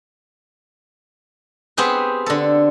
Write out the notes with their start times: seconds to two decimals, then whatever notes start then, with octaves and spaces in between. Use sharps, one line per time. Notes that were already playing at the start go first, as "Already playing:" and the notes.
1.77 B3 C4 G4 G#4 B4
2.26 D3 A4